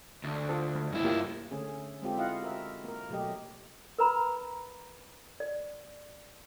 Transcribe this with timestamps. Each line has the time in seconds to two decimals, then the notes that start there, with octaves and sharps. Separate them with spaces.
0.24 D2
0.49 F4 A4 C5
0.75 A3
0.93 G2 E4
1.04 A#3 F4 G4
1.51 D3 A3 C#4 G#4
2.02 G#3 C4 F4 G4 A4
2.17 E4 F4 D#5 F5 F#5
2.42 F#4 A#4 E5
2.84 A#3 A#4
3.10 B2 F#3 A3 G4 D#5
3.98 A#4 B4 A#5 B5
5.40 D5